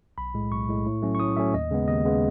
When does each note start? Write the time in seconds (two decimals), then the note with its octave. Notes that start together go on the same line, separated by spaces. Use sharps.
0.18 B1 B5
0.34 A2 G#3
0.51 B1 C#6
0.69 A2 G#3
0.86 A2
1.02 F#3 A3 C#4
1.15 C#6
1.20 A2 D#6
1.37 F#3 A3 C#4 E5
1.54 D#2 D#5
1.71 C#3 G#3 B3
1.88 D#2 D#5
2.05 C#3 G#3 B3